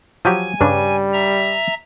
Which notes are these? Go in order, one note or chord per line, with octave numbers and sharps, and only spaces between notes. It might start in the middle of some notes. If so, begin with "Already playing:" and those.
F3 F#3 G4 G#5
G2 C#3 G3 D4
E5 A#5